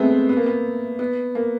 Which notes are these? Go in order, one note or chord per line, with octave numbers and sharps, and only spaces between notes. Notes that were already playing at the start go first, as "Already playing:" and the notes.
Already playing: G#3 A3 B3 C4
B3
B3
A#3
B3
B3
A#3